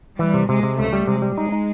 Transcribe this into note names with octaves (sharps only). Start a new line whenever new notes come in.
E3 G3
C3
C3 G#3
C3
C#2 A3
G3
C3 G#3
G3
G#3 D#4
D#4